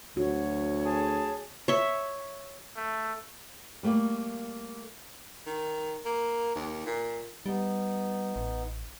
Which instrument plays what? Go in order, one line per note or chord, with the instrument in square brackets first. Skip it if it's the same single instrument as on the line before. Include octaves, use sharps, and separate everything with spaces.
[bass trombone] D2 [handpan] F#4 [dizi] C#5
[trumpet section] G#4 A5
[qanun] C#5 E5
[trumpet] A3
[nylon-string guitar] G3 A3 A#3 D5
[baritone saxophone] D#3
A#3
D#2
A#2
[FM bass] G3 [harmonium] B3 D#4
[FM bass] A1